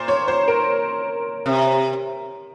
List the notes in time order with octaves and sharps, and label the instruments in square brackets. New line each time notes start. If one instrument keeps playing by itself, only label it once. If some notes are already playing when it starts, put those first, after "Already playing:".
Already playing: [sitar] A#2 [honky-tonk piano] C5
[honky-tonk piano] C#5
C5
A#4
[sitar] C3